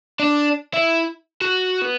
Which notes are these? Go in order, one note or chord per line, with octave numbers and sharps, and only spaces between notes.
D4
E4
F#4
B3